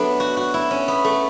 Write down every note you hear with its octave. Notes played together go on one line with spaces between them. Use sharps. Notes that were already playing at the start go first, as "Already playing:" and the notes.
Already playing: F#3 A3 B3 D4
F#4
F#4
E4
C#4
B3
A3